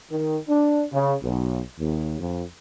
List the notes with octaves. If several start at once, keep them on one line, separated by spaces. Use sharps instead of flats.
D#3
D4
C#3
B1
D#2
F2